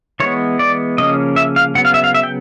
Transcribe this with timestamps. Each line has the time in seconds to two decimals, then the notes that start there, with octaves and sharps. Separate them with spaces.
0.20 E3 G#3 B3 C#5
0.59 D5
0.98 C#3 F3 A#3 C#4 D#5
1.36 E5
1.56 F5
1.75 C#3 F#3 B3 F#5
1.85 F5
1.94 E5
2.04 F5
2.14 E5
2.23 G5